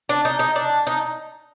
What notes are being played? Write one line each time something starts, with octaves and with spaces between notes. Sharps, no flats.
D4
D#4
D#4
D4
D#4